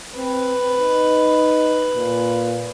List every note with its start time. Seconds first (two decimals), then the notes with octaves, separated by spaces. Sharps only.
0.16 C4 B4
0.79 D#4
1.96 A#2